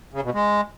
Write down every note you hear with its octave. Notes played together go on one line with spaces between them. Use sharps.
C#3
B2
G#3